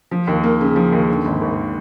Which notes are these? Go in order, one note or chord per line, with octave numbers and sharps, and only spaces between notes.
F3
D#2
A#3
C#3
F3
D#2
D3
G#1
G#1